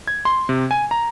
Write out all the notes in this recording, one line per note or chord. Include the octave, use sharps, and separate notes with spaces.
G#6
C6
C3
G#5
A#5